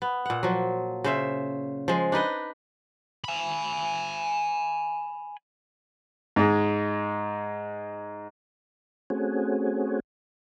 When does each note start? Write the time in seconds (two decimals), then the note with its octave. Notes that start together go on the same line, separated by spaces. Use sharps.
0.02 B3
0.26 A#2 F#5
0.43 F3 F#3
1.04 C#3 C5 E5
1.88 F3 G#3
2.12 D4 D#4 B4 D#5
3.25 G#5 B5
6.36 G#2 G#3
9.10 A3 C4 C#4 F#4 G#4